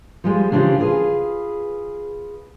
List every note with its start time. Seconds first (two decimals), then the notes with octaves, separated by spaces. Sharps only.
0.24 F3 G3 G#3
0.52 C#3 E3 D4 F4 G4 C5
0.80 F4 G#4 B4